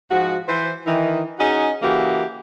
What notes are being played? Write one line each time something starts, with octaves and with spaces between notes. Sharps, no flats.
G#2 F3 F#4
E3 C5
D#3 E3
C#4 D#4 F#4 G#4 D#5
C#3 E3 A#3 F#4 G4